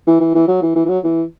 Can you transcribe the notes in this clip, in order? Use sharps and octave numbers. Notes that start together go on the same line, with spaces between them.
E3
E3
E3
F#3
E3
E3
E3
F#3
E3